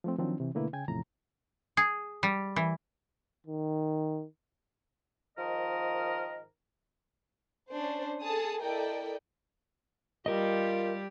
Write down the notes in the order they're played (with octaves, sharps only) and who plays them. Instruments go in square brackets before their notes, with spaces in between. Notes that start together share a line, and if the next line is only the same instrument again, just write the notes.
[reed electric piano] F3 A3 C4
D#3 F3 F#3 C4 D4
C3 E3
B2 D3 A3 A#3 E4 B4
C#3 G5 G#5 G#6
E2 A2 C3 F3 A#5
[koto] G#4
G3
E3
[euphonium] D#3
[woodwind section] G#2 D#3 F3 A#4 D#5
[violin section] C#4 D4 C5
G#4 A4 A5 D#6
E4 A4 A#4 D5 D#5 G5
[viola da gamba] G3 G4 [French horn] F4 [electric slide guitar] A#4 D#5